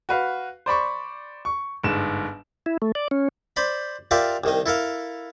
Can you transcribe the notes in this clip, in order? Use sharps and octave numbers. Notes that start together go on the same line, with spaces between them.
F#4 B4 F5
C5 D5 B5 C#6
C#6
G1 G#2 E7
E4
A3
D5
C#4
C5 D5 B5
F4 G4 A#4 D5 E5 F5
C2 D#3 D#5
E4 A4 A#4 F5